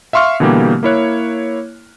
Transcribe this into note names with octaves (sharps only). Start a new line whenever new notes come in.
E5 F5 C6 C#6 F6
B2 D3 E3 G3 A#3 G4
A#3 E4 C#5 F#6